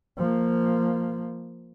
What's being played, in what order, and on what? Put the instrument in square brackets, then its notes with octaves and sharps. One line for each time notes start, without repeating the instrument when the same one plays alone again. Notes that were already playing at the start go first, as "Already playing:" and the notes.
[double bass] F3 A#3